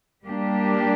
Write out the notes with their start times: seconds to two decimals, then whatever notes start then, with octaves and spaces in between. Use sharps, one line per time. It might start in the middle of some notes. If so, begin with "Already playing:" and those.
0.24 G3 A#3 D4 G4